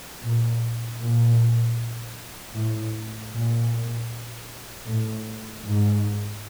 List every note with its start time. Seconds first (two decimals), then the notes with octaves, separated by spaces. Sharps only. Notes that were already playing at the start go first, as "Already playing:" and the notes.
0.22 A#2
1.00 A#2
2.55 A2
3.32 A#2
4.87 A2
5.64 G#2